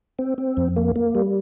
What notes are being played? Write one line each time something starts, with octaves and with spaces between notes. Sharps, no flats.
C4
C4
F2
A#3
A#3
G3